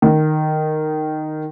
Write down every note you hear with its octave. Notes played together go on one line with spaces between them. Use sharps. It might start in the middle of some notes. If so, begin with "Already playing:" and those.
D#3